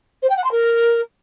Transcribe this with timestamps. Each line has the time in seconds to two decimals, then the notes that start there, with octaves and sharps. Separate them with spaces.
0.22 C5
0.29 G5
0.37 F#5
0.44 C6
0.51 A#4